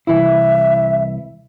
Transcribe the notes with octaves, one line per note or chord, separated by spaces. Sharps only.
C2 E3 E4 E5